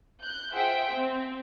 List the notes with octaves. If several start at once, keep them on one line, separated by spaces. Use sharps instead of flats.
F#6 G6
F4 G#4 C5 E5 F#5 G5
C4